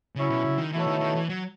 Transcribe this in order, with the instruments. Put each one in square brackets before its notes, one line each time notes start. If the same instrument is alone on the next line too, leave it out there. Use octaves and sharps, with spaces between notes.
[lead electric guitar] C#3 [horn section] F#3 C#4 E4
[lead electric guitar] B2
C#3
D#3
[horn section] B2 A3 E4 A4 C#5 [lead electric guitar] E3
[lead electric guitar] D#3
D#3
E3
F#3